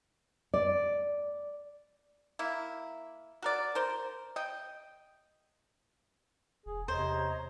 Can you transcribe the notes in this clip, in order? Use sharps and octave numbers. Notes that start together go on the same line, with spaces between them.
D5
A#3 E4
F#4 A#4 D5
A#4 C5
D#5 G5
E1 G#4
E2 C3 C5 C#5 D#5 A#5